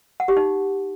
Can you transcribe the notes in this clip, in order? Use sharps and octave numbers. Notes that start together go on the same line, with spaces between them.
F#5
G4
D#4